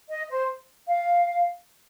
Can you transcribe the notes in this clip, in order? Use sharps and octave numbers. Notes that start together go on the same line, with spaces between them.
D#5
C5
F5